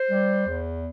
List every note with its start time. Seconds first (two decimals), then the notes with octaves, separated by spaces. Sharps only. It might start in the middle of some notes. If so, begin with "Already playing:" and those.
Already playing: C5
0.09 G3
0.46 E2